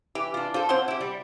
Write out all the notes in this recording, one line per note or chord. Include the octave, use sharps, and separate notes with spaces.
E3 G4
D4 F4
F4 A4 C5
C4 C#4 C5 F#5 C6
E4 G4
G3